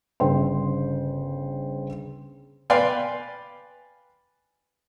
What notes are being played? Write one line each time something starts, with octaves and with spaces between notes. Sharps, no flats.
G1 C#3 C5 G5 C6
B4 D5 F5 G5 G#5 C6